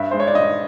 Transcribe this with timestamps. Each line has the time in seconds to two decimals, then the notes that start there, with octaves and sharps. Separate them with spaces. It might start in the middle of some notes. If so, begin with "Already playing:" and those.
Already playing: G2 E5
0.11 G#3 C5
0.20 C#5
0.27 D5
0.35 G2 D#5